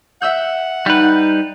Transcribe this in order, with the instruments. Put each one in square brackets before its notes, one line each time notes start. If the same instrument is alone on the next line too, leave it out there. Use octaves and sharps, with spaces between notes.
[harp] E5 E6 G6 [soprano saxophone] F#5
[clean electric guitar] G3 B4 [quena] D#4